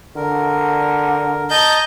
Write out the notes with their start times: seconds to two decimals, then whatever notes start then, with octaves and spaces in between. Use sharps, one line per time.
0.16 D3 A#4
1.50 D#5 A5 A#5 G6